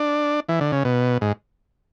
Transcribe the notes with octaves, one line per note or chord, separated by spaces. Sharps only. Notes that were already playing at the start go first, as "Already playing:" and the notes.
Already playing: D4
E3
D3
C#3
B2
G#2